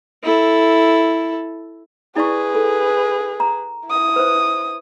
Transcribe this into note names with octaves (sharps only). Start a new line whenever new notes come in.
E4 A4
E4 G#4 B4 D5 C#6
A4
A#5
E4 D#6
B4 C5